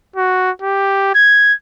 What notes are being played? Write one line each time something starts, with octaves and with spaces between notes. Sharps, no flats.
F#4
G4
G#6